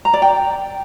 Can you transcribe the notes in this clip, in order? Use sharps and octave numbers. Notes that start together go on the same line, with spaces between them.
A#5
D5
G5